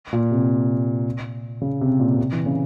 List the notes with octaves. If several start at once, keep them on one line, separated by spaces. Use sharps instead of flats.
A#2
C3
C#3
C3
A#2
C3
E3
C#3